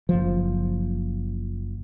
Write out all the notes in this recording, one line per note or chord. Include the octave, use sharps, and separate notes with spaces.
F#1 F3